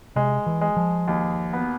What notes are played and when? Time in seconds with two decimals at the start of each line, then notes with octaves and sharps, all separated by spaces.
0.16 C3 G#3
0.46 E3
0.61 G#3
0.77 F3
1.08 D#2
1.53 B3